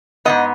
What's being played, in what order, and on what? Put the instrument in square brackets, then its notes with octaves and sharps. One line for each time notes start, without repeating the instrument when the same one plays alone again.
[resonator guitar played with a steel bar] G#2 F3 B3 D#5